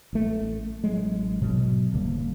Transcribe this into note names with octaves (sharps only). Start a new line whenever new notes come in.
A1 A3
A1 F#3 G#3
G#2 B2 F#3
D#1 D3 G3 A#3